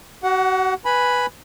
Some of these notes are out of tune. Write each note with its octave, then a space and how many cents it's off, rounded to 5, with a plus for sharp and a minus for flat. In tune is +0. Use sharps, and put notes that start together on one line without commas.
F#4 +35 F#5 +0
B4 +0 G#5 +0 B5 +0